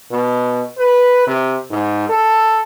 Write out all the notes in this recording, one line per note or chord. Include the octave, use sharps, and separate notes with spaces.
B2
B4
C3
G#2
A4